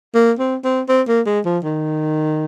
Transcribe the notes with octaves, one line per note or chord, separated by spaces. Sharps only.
A#3
C4
C4
C4
A#3
G#3
F3
D#3